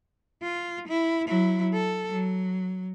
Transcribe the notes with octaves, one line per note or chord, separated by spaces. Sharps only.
F4
E4
F#3 E4
A4
F#3